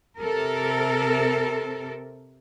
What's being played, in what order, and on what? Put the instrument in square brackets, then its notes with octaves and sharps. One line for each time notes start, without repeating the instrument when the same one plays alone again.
[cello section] C3 A4 A#4